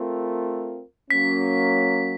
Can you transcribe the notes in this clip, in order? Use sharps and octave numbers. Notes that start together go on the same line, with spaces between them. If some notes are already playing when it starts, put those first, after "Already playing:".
Already playing: A3 C4 F4 A#4
F#3 A#3 C#4 B6